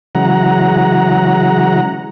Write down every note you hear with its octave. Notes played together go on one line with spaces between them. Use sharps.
C#3 E3 F#3 G#3 F#5 A#5